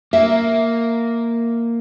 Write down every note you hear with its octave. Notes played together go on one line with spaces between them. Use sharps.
A#3 E5